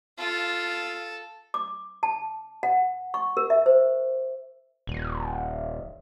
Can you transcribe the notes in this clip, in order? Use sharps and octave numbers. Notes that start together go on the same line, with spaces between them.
F4 A4
D6
A5
F#5
C#6
A#4
E5
C5
D#1